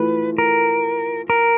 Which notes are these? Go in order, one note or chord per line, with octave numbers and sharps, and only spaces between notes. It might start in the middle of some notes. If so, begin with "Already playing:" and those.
Already playing: E3 A3 F4 B4
A#4
A#4